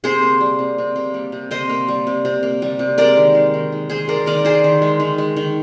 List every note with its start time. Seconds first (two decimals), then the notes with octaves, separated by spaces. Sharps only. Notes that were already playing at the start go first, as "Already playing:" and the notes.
0.04 C3 G#4 C5
0.22 A#3
0.40 G3
0.59 C3
0.78 C3
0.96 A#3
1.14 G3
1.32 C3
1.51 C3 C5 D#5
1.69 A#3
1.88 G3
2.07 C3
2.25 C3
2.43 A#3
2.62 G3
2.79 C3
2.98 G#3 A#4 D5
3.17 D#3
3.35 G#3
3.54 D#3
3.72 G#3
3.89 D#3 G#4 C5
4.08 G#3 A#4 D5
4.26 D#3 A#4 D5
4.45 G#3 G#4 C5
4.64 D#3
4.82 G#3
5.00 D#3
5.18 G#3
5.36 D#3